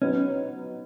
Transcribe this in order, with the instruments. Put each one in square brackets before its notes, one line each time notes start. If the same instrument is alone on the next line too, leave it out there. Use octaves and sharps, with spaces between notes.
[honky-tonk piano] F#3 B3 D#4 [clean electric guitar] C#4